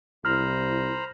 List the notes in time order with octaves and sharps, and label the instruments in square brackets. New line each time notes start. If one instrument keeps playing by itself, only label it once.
[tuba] C2 [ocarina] E4 [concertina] C5 A#5 B5 [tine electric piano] F6